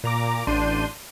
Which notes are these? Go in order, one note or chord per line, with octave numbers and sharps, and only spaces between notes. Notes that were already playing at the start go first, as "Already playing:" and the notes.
A#2 A#5 D6
A1 D4 C6 G6 D#7